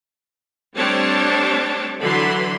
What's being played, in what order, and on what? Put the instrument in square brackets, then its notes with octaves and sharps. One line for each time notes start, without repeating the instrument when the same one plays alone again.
[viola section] G3 A3 C4 D4 C#5 A5
D3 E3 F#3 B5 C6